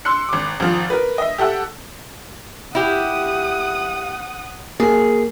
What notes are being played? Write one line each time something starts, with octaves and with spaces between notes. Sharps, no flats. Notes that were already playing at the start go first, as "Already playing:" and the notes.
C6 E6 F#6 C#7
G#1 D6
G#1 F3
A#4 B4
D#5 E5
G4 A4 E5 F#5 E6
E4 G4 F#5 D#6
A#3 G#4